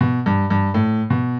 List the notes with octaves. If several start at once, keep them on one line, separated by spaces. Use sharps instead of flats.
B2
G2
G2
A2
B2